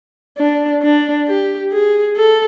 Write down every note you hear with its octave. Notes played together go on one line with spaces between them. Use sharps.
D4
D4
G4
G#4
A4